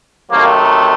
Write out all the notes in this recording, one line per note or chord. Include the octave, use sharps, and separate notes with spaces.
C3 D#3 F#3 A3 A#3